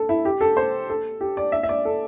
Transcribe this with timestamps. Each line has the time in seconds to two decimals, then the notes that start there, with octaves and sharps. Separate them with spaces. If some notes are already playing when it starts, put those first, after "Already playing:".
Already playing: A4
0.09 E4
0.25 G4
0.41 A4
0.57 C5
0.90 A4
1.21 G4
1.37 D5
1.52 E5
1.63 E5
1.69 D5
1.85 A4